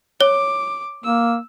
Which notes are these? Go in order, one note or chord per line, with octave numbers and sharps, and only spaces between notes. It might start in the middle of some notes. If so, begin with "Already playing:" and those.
C#5 D6
A#3 E6